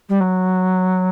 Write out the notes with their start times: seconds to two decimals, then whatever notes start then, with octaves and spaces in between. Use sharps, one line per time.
0.09 G3
0.20 F#3